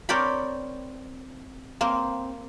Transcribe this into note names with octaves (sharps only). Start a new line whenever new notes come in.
C4 A#4 C#5 D5 G5 B5
A#3 C4